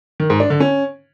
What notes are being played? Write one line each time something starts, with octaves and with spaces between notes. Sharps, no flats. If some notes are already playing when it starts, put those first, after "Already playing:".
D#3
G#2
D4
D3
C#4